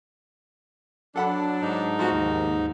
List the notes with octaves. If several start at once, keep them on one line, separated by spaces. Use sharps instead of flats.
F#3 D4 A4 F#5 B5
G#2 D#4
F3 A3 B3 F#4
D#2